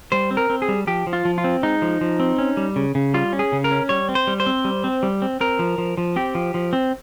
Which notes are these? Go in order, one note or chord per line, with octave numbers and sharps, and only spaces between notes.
G3 C5
C4
A#4
C4
G#4
G3
F3 G4
F3
F4
F3
F4
C4
G#3 D#4
F3
F3
C4
C#4
G3
C#3
C#3
G3 F4
C#4
G#4
C#3
A#4
C#4
G3 C#5
C4
C5
G3
C5
C4
G3
C4
G3
C4
C4 A#4
F3
F3
F3
C4 G4
F3
F3
C4